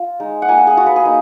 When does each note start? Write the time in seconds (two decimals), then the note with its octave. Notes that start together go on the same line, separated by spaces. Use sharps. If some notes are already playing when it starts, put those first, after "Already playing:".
Already playing: F4
0.20 G#3 D#4
0.42 F#5
0.48 A#3 F4 G#5
0.58 F#5
0.67 G#4
0.77 A#3 F4 F#4
0.86 B4
0.96 G#4
1.05 A#3 D#4